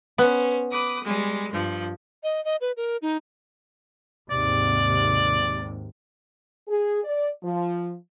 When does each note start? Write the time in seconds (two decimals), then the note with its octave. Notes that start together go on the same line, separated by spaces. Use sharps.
0.18 B3 C#4 C5
0.70 B4 D6 D#6
1.02 G3 G#3
1.51 G2 F3
2.23 D#5
2.45 D#5
2.61 B4
2.77 A#4
3.02 D#4
4.31 D#2 G#2 C3 D5
6.68 G#4
7.04 D5
7.43 F3